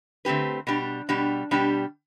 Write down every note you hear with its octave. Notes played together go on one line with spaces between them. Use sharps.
D3 A3 C4 G4 B4
B2 G3 D4 G4
B2 G3 D4 G4
B2 G3 D4 G4